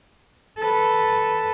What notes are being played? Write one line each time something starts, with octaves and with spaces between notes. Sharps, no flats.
A4 B4